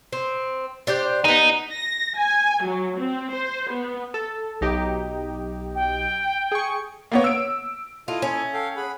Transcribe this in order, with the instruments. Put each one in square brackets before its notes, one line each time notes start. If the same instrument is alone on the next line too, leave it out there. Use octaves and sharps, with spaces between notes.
[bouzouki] C4
D4 G4 C5
[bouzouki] A#3 B3 [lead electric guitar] D#4
[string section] A#6
G#5
F#3
C4
C5
B3
[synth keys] A4
B1 D#4 G4
[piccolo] G5
[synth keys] G#4 C#6
[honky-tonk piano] A#3 B3 C#5
E6 D7
[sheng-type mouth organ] E4 A4 D#5 [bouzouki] F4
[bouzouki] C#4
[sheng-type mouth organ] A4 F5 G5
G#4 F#5 B5